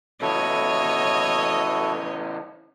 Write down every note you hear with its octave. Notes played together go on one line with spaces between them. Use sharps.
C#3 E3 E4 F#4 A4 C#5 D#5